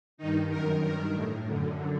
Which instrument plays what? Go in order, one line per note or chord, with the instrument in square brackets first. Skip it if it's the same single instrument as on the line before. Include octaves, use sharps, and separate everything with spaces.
[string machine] G2 D#3 D#4
F#2 D#3 A#4
G2 D#3 A#4
A2
F#2 D3